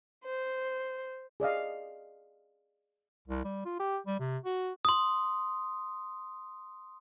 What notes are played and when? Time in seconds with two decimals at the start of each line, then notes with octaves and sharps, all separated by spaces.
0.24 C5
1.40 G#4 D5 D#5 F5
3.27 C2
3.44 G3
3.65 F4
3.80 G4
4.07 G3
4.20 C3
4.45 F#4
4.85 C6 D#6